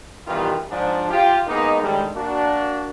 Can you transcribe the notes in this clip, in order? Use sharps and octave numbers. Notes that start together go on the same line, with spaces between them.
B2 D#3 E3 G3 F4 G4
G#2 F3 D4
F4 G4
G#3 A#3 B3 D#4
A2 D3 D#3 G3 G#3
A#3 D4 F#4